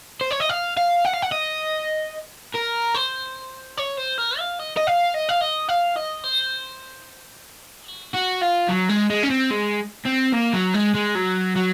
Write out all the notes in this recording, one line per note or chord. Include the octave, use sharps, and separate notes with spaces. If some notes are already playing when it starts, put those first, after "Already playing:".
C5
C#5
D#5
F5
F5
F#5
F5
F#5
D#5
A#4
C5
C#5
C5
A#4
F5
D#5
D#5
F5
D#5
F5
D#5
F5
D#5
C5
F#4
F#4
F4
F#3
G#3
G#3
C#4
C4
G#3
C4
A#3
F#3
G#3
G#3
F#3
F#3